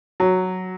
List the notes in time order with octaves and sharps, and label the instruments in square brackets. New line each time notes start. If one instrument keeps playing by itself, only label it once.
[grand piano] F#3